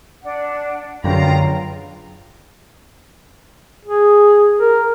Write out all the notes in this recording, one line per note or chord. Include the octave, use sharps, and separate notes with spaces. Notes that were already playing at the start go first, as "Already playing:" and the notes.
D4 F#5
C#2 F#2 B2 D3 F4 F5 G5 A#5
G#4
A#4